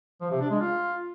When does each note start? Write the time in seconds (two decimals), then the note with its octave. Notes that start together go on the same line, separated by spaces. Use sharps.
0.21 F3
0.31 C3
0.41 D4
0.50 G#3
0.60 F4